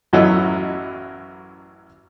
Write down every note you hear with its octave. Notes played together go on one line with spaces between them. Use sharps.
A1 F#2 F#3 E4 A4 D#5